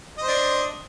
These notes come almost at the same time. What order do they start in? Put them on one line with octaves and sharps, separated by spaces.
D#5 C5 D4